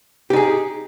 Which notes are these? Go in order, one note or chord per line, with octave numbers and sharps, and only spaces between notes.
D#4 G4 G#4